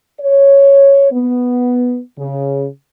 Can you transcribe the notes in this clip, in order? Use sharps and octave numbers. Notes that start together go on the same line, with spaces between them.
C#5
B3
C#3